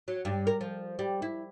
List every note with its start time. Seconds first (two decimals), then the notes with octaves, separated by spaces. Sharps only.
0.08 F#3
0.25 G2
0.47 A#4
0.61 F3
0.99 G3
1.22 E4